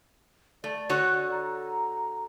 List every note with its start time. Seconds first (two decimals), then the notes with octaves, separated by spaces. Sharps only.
0.64 A3 D5
0.89 D3 F#4 C#5
1.31 A#5